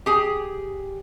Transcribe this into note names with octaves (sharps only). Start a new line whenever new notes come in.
G4 G#4